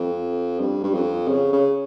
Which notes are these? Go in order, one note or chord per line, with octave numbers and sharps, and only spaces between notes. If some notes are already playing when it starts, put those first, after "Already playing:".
Already playing: F2
G2
G2
F2
C#3
C#3